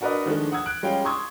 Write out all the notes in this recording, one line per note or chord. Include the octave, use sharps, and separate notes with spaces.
D4 F#4 A#4 B4 D5 D#5
D#3 F3 G#3 A3 D4
F#5 D#6 E6 G#6
F#6 D7
G3 G#3 C#4 F4 G5
C6 C#6 D#6 E6 G#6